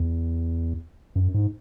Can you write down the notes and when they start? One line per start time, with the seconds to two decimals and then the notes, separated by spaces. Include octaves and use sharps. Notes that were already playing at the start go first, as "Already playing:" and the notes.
Already playing: E2
1.16 F#2
1.34 G#2